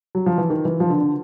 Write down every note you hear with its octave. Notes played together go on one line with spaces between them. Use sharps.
F#3
F3
E3
D#3
E3
F3
D3
D3